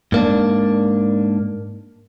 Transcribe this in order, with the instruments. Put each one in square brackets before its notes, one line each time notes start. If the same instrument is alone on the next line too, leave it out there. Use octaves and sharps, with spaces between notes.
[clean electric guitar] G#2 A#3 D4